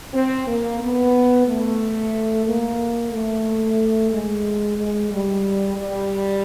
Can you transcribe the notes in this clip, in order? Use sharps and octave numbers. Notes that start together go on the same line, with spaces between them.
C4
A#3
B3
A3
A#3
A3
G#3
G#3
G3
G3